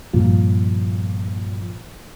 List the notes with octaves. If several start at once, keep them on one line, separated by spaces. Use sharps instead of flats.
G2 A#2 F3 F4